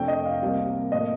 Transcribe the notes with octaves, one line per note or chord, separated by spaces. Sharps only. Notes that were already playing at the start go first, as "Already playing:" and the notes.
Already playing: F2 C3 F3 A3 D4 G5
D#5
F5
C2 C3 G3 A#3
A2 F3 A#3 D#5